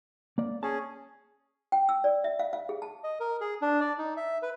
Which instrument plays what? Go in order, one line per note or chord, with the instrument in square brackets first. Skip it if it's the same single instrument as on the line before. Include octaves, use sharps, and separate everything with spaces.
[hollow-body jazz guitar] A#3 D5
[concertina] C#4 G#4 [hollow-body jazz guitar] A5
[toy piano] G5
E6
D5
E5
F5
F5
G#4
A5
[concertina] D#5
A#4
G#4
D4
D5
D#4
E5
B4